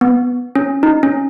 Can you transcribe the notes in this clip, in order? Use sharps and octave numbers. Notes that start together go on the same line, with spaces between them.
B3
C#4
D#4
C#4